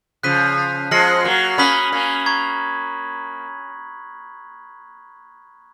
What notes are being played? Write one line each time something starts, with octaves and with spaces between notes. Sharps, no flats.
C#3 F3 F#6 B6 D#7
F3 G#3 F6 A#6 C#7 F#7
F#3 A#3
A#3 C#4 B5 D#6 F#6 B6 F#7
A#3 C#4
A#5 C#6 G#6